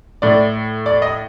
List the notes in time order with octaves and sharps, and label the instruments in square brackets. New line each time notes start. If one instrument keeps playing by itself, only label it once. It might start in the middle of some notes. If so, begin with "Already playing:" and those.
[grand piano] A2 D5
D5
D#5